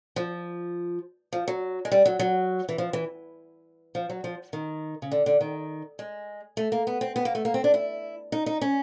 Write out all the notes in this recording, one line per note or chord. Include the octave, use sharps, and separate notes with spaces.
F3
F3
F#3
G#3
G3
F#3
F#3
E3
F3
E3
F3
F#3
F3
D#3
C#3
D3
D3
D#3
G#3
A3
A#3
B3
C4
B3
A#3
A3
A#3
C4
D4
E4
D#4
D#4
C#4